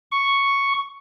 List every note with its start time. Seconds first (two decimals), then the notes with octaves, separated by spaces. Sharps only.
0.12 C#6